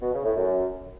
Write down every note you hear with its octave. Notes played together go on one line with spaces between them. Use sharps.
B2
C#3
A2
F#2